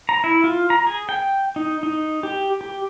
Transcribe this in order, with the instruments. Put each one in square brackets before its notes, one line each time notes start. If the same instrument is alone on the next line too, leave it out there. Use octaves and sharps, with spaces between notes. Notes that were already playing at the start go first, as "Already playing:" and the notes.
[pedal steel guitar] A#5
E4
F4
A#5
G#4
G5
D#4
D#4
G4
G4